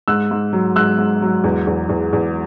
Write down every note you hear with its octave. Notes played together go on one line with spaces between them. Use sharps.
G#2 E6 F#6
G#2
F#3
G#2 E6 F#6
G#2
F#3
E2
E2
E2
E2